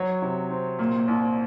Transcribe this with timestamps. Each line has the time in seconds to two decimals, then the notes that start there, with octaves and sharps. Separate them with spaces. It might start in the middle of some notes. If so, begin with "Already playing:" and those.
Already playing: F#3 C#5
0.22 C3
0.50 C4
0.79 A#2
1.08 C2